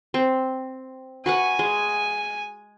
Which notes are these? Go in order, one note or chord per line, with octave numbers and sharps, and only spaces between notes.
C4
F#4 B4 F#5 G#5
G#3